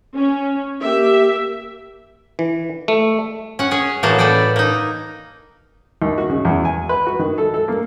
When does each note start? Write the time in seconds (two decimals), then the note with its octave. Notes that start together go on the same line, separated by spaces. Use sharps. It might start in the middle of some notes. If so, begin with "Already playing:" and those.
0.15 C#4
0.82 A#3 G4 E5
2.39 E3
2.88 A3
3.59 C#4 F#5
3.71 C#4 G#4 C#5
4.03 A2 E3 A#3 F#4 G#4 A5
4.18 A4 B4 D5 F#5 G5
4.56 A#3 D#4
6.02 D#2
6.18 F#4
6.29 C#3
6.45 E2
6.65 G#5
6.89 B4
7.07 F#4
7.19 D#3
7.38 A4
7.54 A4
7.68 A#3